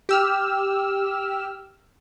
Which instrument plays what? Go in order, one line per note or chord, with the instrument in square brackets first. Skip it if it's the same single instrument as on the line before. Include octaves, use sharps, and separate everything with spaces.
[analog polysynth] G4 E6 F6